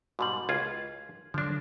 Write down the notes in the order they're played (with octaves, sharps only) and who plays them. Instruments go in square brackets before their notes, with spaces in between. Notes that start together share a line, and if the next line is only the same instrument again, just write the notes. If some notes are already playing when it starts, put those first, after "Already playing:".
[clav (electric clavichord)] G#2 B2 G3 [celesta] F#4 C6 F#7
[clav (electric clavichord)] C#2 F4 [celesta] G#6
[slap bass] D3 F#3 [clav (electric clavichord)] F3 D4